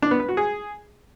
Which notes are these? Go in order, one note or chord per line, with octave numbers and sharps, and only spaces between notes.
D4
B3
B4
F#4
G#4